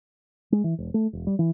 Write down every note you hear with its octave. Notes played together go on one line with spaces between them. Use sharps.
G#3
E3
E1
A3
E1
G3
E3